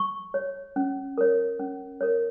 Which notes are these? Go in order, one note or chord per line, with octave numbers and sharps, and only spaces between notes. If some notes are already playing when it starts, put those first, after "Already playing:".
Already playing: C#6
C#5
C#4
A#4 C#5
C#4
A#4 C#5